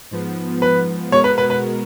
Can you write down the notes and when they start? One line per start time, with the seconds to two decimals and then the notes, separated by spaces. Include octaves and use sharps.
0.11 G#2 F3 B3
0.62 B4
1.12 B2 G#3 B3 F#4 A#4 C#5
1.24 B4
1.38 B4
1.50 B4